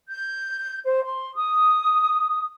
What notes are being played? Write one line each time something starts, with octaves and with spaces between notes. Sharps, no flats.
G6
C5
C6
D#6